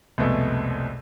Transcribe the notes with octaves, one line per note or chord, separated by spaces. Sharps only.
C2 F2 B2 G#3 A3